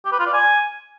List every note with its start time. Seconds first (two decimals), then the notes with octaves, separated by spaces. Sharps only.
0.05 G4
0.12 B4
0.19 F4
0.26 D5
0.33 G#5